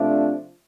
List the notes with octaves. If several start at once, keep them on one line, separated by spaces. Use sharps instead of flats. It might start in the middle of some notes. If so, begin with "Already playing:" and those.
Already playing: C3 F3 A3 D4